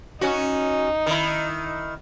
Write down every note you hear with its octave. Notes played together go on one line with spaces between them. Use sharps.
C#4 D#4 F#4
D#3 E4